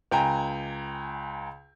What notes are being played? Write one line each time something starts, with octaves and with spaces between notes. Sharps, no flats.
C#2 G5 G#5 A#5